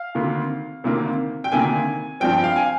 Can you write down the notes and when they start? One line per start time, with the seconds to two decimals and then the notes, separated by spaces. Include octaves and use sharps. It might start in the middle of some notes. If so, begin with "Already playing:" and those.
Already playing: F5
0.15 D2 C3 D#3 A#3
0.84 D2 C3 D#3 A#3
1.44 G5
1.52 D2 C3 D#3 A#3 G#5
2.20 G2 F3 C4 G5
2.44 F5
2.56 G#5